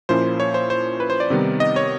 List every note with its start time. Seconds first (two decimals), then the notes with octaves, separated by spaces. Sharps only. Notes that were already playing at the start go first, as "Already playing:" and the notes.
0.09 A#2 F3 A#3 C#4 E4 C5
0.40 C#5
0.54 C5
0.70 C5
1.00 B4
1.10 C5
1.20 D5
1.30 C3 D#3 G3 B3 D#4
1.60 D#5
1.76 C#5